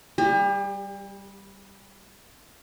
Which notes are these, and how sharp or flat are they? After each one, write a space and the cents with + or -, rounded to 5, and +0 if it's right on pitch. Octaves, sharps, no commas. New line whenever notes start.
G3 +0 G4 +40